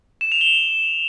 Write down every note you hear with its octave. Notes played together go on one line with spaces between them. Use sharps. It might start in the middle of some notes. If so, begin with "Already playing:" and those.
E7
F7
G7